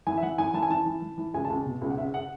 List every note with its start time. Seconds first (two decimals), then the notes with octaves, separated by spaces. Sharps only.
0.07 E3 G#5
0.17 E5
0.23 E3 F#5
0.38 E3 G#5
0.54 E3 A5
0.63 G#5
0.70 E3 A5
0.86 E3
1.02 E3
1.18 E3
1.34 C#2 G#5
1.45 A5
1.50 C#2
1.66 B2
1.81 C#2
1.90 F#5
1.98 C#3 E5
2.14 F#5